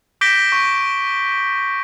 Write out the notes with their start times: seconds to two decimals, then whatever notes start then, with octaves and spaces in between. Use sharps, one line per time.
0.21 D6 G6 A#6 B6 D7 G7
0.52 C#6